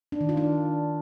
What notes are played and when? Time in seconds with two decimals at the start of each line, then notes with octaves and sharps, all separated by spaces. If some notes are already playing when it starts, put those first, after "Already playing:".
0.12 D4
0.21 D#3
0.29 F4
0.37 D4